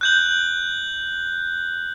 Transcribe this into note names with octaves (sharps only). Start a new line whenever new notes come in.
F#6 G6 F#7